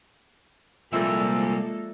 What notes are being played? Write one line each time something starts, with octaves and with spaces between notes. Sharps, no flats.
C2 A#2 F3 G#3 A#3 D4 A4 E5